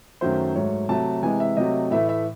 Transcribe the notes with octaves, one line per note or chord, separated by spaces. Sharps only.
F#2 D#3 F#3 A3 C5
G#2 F#3 A3 C#5
C3 F#3 A3 A5
C3 E3 G#3 G#5
E5
C3 F#3 A3 D#5
A2 E3 A3 E5
E5